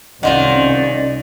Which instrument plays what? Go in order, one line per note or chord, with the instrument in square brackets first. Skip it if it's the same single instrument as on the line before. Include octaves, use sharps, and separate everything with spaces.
[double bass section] C2 C#4 [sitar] D#3 [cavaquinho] F4 C5 F#5 [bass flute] D5